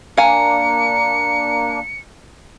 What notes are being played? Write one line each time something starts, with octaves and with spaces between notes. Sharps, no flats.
A#3 D4 F5 G#5 A#5 C#7